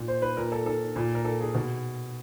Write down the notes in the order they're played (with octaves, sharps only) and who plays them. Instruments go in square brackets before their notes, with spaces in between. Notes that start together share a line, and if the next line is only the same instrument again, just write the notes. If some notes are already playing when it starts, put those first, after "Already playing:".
Already playing: [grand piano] A#2
C5
B4
A#2 A#4
A4
A4
A#2
A#4
A4
G#4
B2